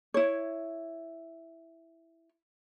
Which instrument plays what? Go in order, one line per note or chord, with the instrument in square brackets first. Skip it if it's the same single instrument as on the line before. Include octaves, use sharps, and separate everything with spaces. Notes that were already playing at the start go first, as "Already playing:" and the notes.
[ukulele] E4 C#5